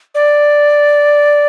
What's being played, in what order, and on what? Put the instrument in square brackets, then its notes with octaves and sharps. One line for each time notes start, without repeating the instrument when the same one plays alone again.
[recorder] D5